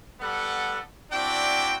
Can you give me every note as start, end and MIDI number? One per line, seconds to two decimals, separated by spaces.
0.21 0.79 55
0.21 0.79 59
0.21 0.79 69
0.21 0.79 78
1.12 1.75 60
1.12 1.75 62
1.12 1.75 64
1.12 1.75 66
1.12 1.75 74
1.12 1.75 79